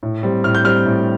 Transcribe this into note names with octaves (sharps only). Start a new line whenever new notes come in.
A2
G3 C4
A2 F6
G6
G3 C4 F6
A2